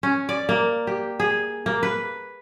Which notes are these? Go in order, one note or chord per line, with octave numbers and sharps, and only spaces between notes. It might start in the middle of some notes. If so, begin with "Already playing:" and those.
C#4
D5
A#3
G4
G#4
A#3
B4